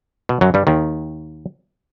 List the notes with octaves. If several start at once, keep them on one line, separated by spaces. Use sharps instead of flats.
B2
F#2 F#3
G2 G3
D#2 D#3